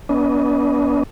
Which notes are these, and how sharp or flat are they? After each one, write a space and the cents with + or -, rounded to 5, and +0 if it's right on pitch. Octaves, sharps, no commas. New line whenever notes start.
B3 -25 D4 -40 D#5 +10